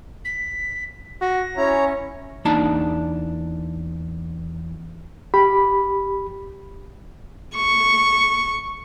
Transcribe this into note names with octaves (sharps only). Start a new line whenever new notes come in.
B6
F#4 A#6
C#4 E4 C#5 A#5
E2 A#3 D4 D#4 A5
G4 B5
C#6